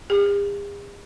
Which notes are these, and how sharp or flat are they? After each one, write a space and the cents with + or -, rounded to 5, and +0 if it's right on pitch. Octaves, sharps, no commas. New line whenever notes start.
G#4 -45